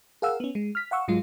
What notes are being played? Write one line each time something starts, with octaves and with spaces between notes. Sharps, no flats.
G#4 A#4 F5 F#5 E6
B3 C#4
G#3
F6 B6
F5 F#5 C#6 E6
G#2 F#3 G#3 F4